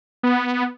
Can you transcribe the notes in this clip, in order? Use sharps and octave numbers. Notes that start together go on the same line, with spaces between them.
B3